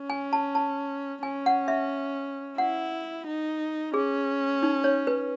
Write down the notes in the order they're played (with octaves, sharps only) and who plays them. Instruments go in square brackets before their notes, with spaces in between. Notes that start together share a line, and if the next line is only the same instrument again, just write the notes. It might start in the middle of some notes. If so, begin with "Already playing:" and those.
Already playing: [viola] C#4
[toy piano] G#5
A5
A5
[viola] C#4 [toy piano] G#5
[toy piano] F#5
E5
[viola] E4 [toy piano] F#5
[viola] D#4
[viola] C#4 [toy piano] G#4
[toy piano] D#4
C#5
B4